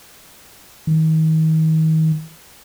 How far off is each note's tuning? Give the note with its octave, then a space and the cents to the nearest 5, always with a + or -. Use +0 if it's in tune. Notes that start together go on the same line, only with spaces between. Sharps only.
D#3 +35